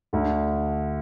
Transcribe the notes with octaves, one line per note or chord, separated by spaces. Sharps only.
D2 D3